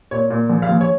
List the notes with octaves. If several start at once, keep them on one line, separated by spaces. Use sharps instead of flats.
A#2 C#5
A#2
A#1
F5
A#1
C#5